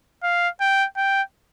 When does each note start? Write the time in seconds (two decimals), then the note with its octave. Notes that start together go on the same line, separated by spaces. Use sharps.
0.23 F5
0.61 G5
0.97 G5